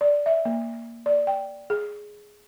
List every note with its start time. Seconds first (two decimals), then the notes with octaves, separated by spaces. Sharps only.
0.01 D5
0.26 E5
0.45 A#3
1.06 D5
1.27 G5
1.70 G#4